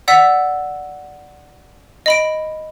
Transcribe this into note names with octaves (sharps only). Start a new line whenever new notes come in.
D5 F#5 E6 B6
D#5 B5 D7